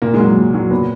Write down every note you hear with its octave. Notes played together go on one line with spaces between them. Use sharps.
A#2 A#3
G#3
F#3
A#3
A#2
F#3
A#2 B3